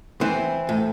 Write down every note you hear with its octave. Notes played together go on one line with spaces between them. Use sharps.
E3 C4
A2